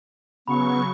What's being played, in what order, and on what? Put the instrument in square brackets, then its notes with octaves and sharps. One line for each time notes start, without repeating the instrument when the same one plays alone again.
[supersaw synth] C#3 F#3 C#6 [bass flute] B3 [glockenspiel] B5